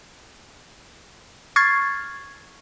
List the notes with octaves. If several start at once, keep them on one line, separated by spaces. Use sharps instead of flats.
C#6 F6 G#6 A6 C7